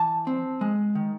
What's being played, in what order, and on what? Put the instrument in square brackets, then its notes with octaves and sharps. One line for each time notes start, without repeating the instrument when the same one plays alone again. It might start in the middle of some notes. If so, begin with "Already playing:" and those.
Already playing: [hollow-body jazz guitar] E3 A5
C4
G#3
D#3